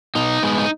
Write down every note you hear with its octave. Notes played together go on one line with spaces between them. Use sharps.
B2 D#4
G#3 B3
D#4